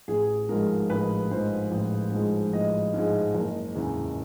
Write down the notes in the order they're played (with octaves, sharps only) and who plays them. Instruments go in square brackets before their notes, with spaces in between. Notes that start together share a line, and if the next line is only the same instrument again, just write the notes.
[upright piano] A1 G#4
G#2 F3 G#3 A#4
A1 B4
G#2 F3 G#3 C5
A1
G#2 F3 G#3
A1 D#5
G#2 F3 G#3
F#1
E2 C#3 E3